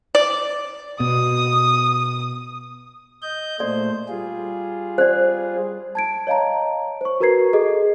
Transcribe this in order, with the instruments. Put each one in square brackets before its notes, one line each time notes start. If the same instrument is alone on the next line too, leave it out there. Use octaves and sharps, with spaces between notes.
[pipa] D5
[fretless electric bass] B2 [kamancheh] D#6
[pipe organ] D#5 G6
[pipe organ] A#2 A3 C5 [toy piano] D5
[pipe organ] G3 F4 G#4
[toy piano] C5 D5
[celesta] A5 G#6 D7
C#5 D#5 F5 A5 A#5
C5 C#6
F#4 A#4 B4 A#5 G#6 C7
G#4 A4 D#5